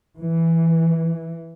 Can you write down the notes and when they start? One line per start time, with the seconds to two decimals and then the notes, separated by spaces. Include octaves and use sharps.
0.18 E3